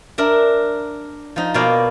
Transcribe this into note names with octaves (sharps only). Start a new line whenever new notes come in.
D4 A#4 E5
F3 D#4
B2 A#3 D5 F5 G5